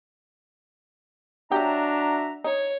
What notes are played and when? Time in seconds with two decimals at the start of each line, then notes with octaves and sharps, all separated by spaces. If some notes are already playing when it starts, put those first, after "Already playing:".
1.52 F#3 D4 F#4 G4 E5 A#5
2.44 D#4 C#5